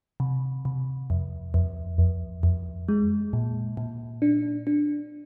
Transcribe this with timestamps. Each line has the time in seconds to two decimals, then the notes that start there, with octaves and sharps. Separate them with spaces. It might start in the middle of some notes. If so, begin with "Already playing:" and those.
0.20 C3
0.65 C3
1.10 F2
1.54 F2
1.98 F2
2.43 F2
2.89 G#3
3.33 A#2
3.77 A#2
4.22 D4
4.67 D4